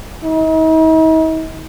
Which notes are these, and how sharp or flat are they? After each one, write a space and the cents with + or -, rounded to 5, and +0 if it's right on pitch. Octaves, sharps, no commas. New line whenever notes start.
D#4 +45